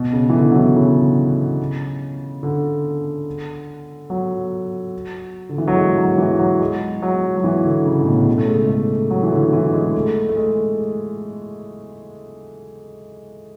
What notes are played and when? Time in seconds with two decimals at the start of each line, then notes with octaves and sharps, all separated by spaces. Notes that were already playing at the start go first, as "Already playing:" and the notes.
Already playing: B2
0.13 C#3
0.30 E3
0.34 D3
0.51 F#3
0.55 E3
0.76 C#3
2.43 D3
4.10 F#3
5.49 D3
5.58 E3
5.68 F#3
5.76 G#3
5.98 F#3
6.18 E3
6.39 F#3
6.60 G#3
7.02 F#3
7.37 F#3
7.44 E3
7.65 D3
7.86 C#3
8.01 A2
8.06 B2
8.27 C#3
8.38 A3
8.48 G#3
8.59 G#3
8.69 A3
9.10 F#3
9.23 E3
9.32 D3
9.53 E3
9.74 G#3
9.94 A3
10.29 A3
10.36 G#3